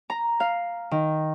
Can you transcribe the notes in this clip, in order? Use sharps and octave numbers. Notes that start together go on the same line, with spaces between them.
A#5
F5
D#3